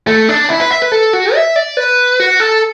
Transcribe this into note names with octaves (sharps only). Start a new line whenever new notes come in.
A3
D4
E4
B4
E5
B4
A4
F#4
E5
D5
B4
F#4
A4